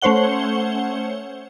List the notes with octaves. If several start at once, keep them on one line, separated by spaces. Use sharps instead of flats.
A3 C#4 C5 C#5 F#5 G7